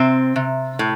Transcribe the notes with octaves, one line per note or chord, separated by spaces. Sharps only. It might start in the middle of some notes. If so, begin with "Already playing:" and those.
Already playing: C3 C4
C3
A2